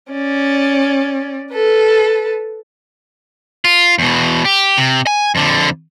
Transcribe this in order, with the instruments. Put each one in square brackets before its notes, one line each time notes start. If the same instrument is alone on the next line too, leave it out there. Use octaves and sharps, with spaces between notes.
[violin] C#4 D5
A4 B4
[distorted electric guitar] F4
E2 B2
G4
C3
G#5
F2 D3